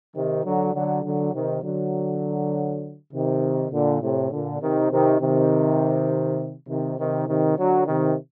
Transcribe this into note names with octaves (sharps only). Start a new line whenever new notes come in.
C3 D#3
D3 F#3
D3 F#3
D3 F#3
C3 D#3
D3 F#3
C3 D#3
A#2 D3
A2 C3
A#2 D3
C3 D#3
C3 D#3
C3 D#3
C3 D#3
C3 D#3
C3 D#3
D3 F#3
C3 D#3